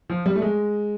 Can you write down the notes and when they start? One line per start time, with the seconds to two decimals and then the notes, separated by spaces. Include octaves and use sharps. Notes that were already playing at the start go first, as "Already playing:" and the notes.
0.10 F3
0.26 G3
0.36 A3
0.42 G#3